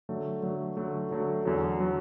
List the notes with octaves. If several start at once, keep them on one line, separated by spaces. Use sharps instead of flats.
D3 F#3 A3
D3 F#3 A3
D3 F#3 A3
D3 F#3 A3
E2 D3 F#3
D3 F#3